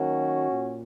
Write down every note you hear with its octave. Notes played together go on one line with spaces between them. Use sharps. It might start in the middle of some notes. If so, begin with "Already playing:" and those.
Already playing: D#3 F#3 A#3 C#4 F#4
A#2